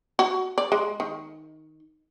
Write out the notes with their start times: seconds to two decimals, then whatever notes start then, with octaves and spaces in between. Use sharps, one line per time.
0.19 F#4
0.58 D5
0.72 G#3
1.00 D#3